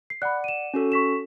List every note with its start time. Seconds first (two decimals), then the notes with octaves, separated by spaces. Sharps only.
0.10 C7
0.22 D5 F#5 B5 F#6
0.44 D#7 E7
0.74 C#4 F#4 A4
0.92 C#6 B6 E7